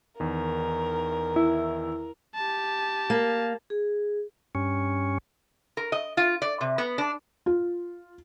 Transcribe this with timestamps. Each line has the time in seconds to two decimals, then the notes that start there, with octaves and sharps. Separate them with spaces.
0.20 E2 D#3 A#4
1.36 E4
2.35 G4 A5
3.10 A#3
3.70 G#4
4.55 G2 C#4
5.77 A#4
5.92 D#5
6.17 F4
6.42 D5
6.61 C3
6.78 B3
6.98 D4
7.46 F4